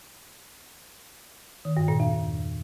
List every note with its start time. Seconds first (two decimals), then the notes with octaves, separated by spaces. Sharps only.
1.65 D#3
1.77 G2
1.88 A#2
2.00 E2